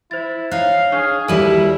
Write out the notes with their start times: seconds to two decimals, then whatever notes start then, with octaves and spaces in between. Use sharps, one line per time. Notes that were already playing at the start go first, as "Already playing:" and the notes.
0.11 E4 C5 A6
0.51 D#4 C#5 F5 F#6 C7
0.92 D4 G#4 C#6 F6
1.28 D#2 G3 E4 F#4 A4 D#7 F#7